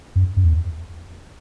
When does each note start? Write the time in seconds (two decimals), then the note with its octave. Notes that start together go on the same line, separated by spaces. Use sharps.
0.16 F#2
0.37 F#2
0.45 E2